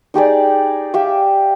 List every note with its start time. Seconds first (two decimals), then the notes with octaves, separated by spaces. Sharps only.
0.14 D#4 G4 G#4 D5
0.94 G4 E5 F5